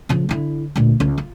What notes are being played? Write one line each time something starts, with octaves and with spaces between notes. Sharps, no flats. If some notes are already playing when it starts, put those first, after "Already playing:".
C#3 F3
D3 E4
D2 A#2
C#2
F4